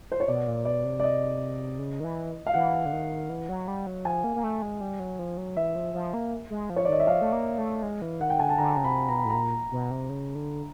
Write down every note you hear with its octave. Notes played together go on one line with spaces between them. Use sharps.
C5
C#5
B2 D5
A#2
B2 D5
C3
D5
D#5
C#3
D#3
E3
F5
E3 F#5
D3
D#3
E3
F#3
G3
F#3
F3 G#5
A#3
A#3
A3
G#3
G3
F#3
F3
F#3
E3 E5
F3
F3
A#3
G#3
F3
C#5
D5
D#3 D#5
E5
F3 F5
A3
A#3
A3
G#3
E3
D#3 F#5
G5
D3 G#5
A5
D3 A#5
C#3
C3 B5
B2 A#5
B5
A2
A#2 A#5
B2
C3
C#3
D3